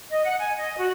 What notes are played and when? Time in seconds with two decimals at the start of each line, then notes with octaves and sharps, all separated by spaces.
0.11 D#5
0.24 F#5
0.38 G#5
0.58 D#5
0.78 F#4